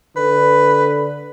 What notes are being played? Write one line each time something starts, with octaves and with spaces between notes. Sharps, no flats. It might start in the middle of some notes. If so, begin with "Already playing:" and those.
D3 B4